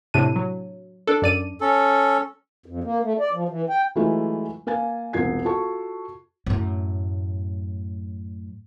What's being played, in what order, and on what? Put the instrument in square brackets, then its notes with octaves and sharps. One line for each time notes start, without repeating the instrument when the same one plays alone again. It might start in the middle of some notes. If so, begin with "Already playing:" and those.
[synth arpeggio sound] A2 C3 D4 D#7
F#3
D4 A4
F#2 D5 D#7
[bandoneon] C#4 A4
[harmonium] F2
A#3
A3
D5
F3
E3
G5
[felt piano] E3 F#3 G#3 A3 E4 F4
A#3 F5 G#5 A6
E1 C2 F4 G#6 C7
F4 F#4 A4 A5 C#6
[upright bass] F#2 A2